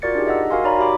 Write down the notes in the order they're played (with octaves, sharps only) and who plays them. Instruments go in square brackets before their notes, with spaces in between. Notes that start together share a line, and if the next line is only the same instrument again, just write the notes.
[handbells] F4 F#4 A#4 D5 A6 C#7
D4 D#4 G4 G#4
D#5 E5 F#5 E6
F#4 A#4 F5 G#5 C6
D#4 C#5 D5 A#5 B5
F#4 G4 E5 B5 D6